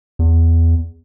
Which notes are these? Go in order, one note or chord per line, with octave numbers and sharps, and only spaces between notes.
E2